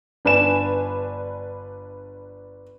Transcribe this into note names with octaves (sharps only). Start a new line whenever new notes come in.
G1 D4 B4 G#5 E7